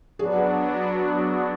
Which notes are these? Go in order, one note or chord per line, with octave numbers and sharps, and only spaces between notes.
F#3 B3 D4 F#4 G#4